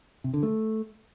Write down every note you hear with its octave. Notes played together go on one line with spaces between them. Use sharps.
C3
D3
A3